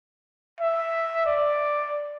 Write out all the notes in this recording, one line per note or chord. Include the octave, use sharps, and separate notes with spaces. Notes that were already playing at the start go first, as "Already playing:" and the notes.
E5
D5